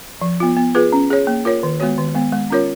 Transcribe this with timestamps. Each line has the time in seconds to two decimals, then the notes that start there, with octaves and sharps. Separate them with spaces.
0.22 F3
0.40 B3 F4
0.57 B3
0.75 F4 G#4 B4
0.92 C#4
1.10 G#4 C#5
1.27 A#3
1.45 F4 A#4 C#5
1.63 D#3
1.80 G#3 B3 F#4 C#5
1.98 D#3
2.15 G#3 B3
2.33 G#3
2.50 C#4 F4 A#4 C#5